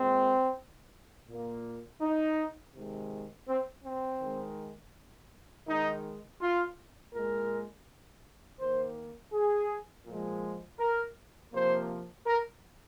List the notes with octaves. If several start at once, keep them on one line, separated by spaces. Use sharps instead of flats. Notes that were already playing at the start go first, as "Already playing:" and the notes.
Already playing: A#2 G#3 C4
A#2 A#3
D#4
C3 D#3 G#3
C4
C4
D#3 G#3
D#3 G#3 D#4
F4
A#2 G#3 A#4
D#3 A#3 C5
G#4
A#2 F3 G#3
A#4
C3 F3 A#3 C5
A#4